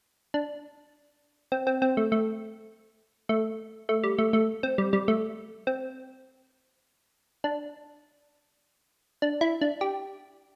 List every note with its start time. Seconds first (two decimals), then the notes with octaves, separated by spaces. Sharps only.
0.34 D4
1.52 C4
1.67 C4
1.82 C4
1.97 A3
2.12 A3
3.29 A3
3.89 A3
4.04 G3
4.18 A3
4.33 A3
4.63 C4
4.78 G3
4.93 G3
5.08 A3
5.67 C4
7.44 D4
9.22 D4
9.41 E4
9.61 D4
9.81 G4